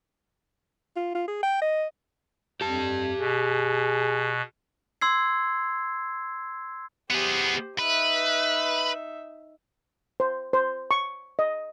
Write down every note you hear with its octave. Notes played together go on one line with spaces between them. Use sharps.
F4
F4
G#4
G5
D#5
F2 G4 A5
B2 G#4
C6 E6 G#6 C7
B3 G4 G#4 C5
D#4 B4 E5
C5
C5
C#6
D#5